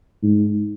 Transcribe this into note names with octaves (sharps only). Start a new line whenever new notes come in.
G#2